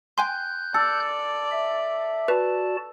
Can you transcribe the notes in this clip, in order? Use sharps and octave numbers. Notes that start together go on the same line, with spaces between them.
G5 G#5 C6 F#6 G6
A4 D5
E5
F#4 B4 D5 A5